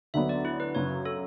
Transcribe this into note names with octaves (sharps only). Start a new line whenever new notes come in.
D2 D3 F#3 B3 D4 E5
D5
E4
B4
F#2 C#3 F#3 C#5
A4